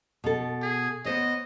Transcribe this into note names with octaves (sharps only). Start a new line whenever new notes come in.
B2 A4
G#4
B3 C5 C#5 D#5